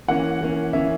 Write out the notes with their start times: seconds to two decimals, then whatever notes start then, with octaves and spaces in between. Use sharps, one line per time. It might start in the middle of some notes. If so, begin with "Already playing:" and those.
0.08 E3 A#3 C#4 F#5
0.41 E3 A#3 C#4
0.73 E3 A#3 C#4 E5